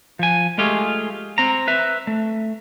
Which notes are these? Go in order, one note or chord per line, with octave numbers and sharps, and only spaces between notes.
F3 G#5
G#3 A3 F4 G4 G#4
C4 A#5
B4 E5
A3